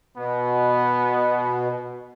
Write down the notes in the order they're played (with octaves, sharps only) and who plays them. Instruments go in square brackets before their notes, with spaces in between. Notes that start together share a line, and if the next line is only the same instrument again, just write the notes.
[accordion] B2 [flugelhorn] B3